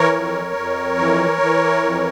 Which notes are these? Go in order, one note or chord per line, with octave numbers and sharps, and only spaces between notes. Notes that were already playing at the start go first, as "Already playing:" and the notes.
Already playing: E3 A#4 C#5
F2
F2
E3
E3
F2